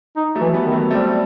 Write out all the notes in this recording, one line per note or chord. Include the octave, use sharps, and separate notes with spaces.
D#4
F#3 A3
E3
G3 B3
D#3
F#3 A3
G3 A3 C4